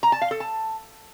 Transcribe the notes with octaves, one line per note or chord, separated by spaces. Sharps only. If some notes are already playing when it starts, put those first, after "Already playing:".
A#5
A5
F5
A4
A5